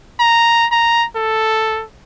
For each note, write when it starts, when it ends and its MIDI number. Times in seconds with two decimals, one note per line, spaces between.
0.19 0.66 82
0.71 1.05 82
1.16 1.84 69